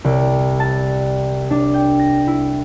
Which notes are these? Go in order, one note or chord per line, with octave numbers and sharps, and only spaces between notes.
C2
A5
D4
G5
A#6
E4